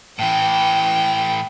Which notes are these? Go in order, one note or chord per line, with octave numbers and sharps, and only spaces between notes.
A2 E3 G5